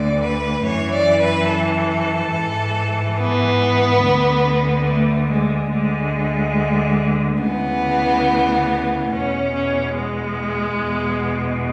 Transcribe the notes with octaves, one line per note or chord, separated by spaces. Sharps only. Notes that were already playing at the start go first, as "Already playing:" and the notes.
Already playing: D2 D3 D5
B4
F#2 E3 C#5
D5
B4
A4
G#2 E3
B3
D2 D3
A3
G#3
D2 D3 G#3
D2 C#3 E3 B3
E2 B2 C#4
C#4
G#3
E2 B2